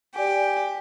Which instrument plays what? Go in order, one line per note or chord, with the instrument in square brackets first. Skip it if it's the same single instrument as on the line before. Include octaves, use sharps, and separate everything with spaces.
[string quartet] G4 [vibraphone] D5 G#5